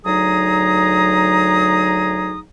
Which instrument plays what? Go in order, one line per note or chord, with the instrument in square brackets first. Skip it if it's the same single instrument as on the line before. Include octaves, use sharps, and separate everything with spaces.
[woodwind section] D2 F#3 D#4 G#4 A#5 D#6